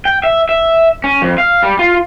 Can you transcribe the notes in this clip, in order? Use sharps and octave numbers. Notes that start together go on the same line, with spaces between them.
G5
E5
E5
C#4
F2
F5
G3
F4